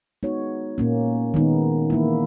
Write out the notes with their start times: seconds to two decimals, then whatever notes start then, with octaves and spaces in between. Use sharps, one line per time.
0.23 G#3 B3 D#4 F#4 C#5
0.78 A#2 A#3 C#4
1.34 D#3 G#3 B3 D#4
1.90 E3 A#3 E4